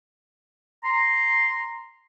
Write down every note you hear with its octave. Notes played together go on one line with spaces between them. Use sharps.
A#5 C6